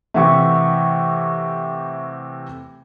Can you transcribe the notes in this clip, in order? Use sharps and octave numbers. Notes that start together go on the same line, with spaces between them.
C3 E3 A3 E5 F#5 C#6